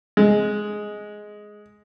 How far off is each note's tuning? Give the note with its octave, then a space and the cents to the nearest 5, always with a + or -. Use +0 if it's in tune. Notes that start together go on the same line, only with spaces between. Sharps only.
G#3 +5